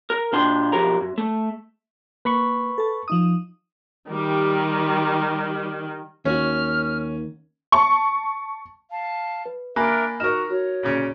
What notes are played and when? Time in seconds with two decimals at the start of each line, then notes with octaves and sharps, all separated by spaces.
0.10 A#4
0.33 A#2 D4 G5 C6
0.72 B1 E2 F3 G4 A#4 A#5
1.01 F#2
1.18 A3
2.25 A#3 B4 B5 C#6
2.78 A4 A5
3.08 F3 D#4 D#6
4.11 D#3 G3
6.25 D#2 D#3 C#4 F#4 F6
7.72 A5 C#6
8.92 F5 A5
9.45 B4
9.76 A#3 D4 A#4 E5 G#5 B5 F#6
10.20 D#4 F#4 A#4 F6 E7
10.50 F#4 C#5
10.83 A#2 C#3 C#4